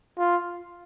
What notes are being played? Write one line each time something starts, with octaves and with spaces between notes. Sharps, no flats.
F4